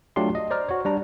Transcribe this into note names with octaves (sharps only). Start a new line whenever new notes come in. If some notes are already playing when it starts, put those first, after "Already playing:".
F#3 A3 D4 F4 G4 C6
D#5
C5 D5 A#5 F6
F#4 C#5
G3 D4 A#5